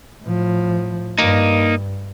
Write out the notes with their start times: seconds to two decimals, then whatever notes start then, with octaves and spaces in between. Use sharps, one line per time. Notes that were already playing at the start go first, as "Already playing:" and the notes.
0.23 A2 F3
1.18 G2 A#3 D#4